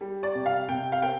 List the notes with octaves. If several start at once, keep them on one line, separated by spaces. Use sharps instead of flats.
G3
D5
C3
F5
C3 G5
F5
C4 G5